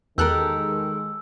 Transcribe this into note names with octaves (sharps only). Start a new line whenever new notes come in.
E2 D#3 G#3 G4 A4 A#4 E6 F#6